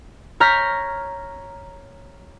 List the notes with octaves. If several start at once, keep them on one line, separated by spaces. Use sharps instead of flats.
C#5 A#5 F6 G6 B6